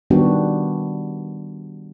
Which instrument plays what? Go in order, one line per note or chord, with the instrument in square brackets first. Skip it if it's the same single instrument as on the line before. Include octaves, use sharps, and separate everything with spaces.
[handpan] D#3 G3 B3 D4 F#4 G4